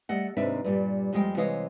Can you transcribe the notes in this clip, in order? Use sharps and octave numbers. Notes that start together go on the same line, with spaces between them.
G3 A3 D#5 F#5
D#2 G#2 C3 D4 B4 E5
G2 A#2 G3
F2 G3 G#3 A#3 G5
C3 E3 G#3 C#5 D#5 F5